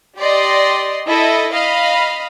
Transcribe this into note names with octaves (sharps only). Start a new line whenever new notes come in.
G4 D5 D#5 C6
E4 A4 D#5
D#5 F5 B5